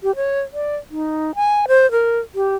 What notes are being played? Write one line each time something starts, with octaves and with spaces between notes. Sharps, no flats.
G4
C#5
D5
D#4
G#5
C5
A#4
G4